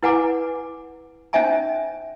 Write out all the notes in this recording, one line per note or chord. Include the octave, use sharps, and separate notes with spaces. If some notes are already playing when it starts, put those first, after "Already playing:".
E4 B4 F#5 G#5 A#5 D6
C#4 D#4 C5 E5 G#5 A#5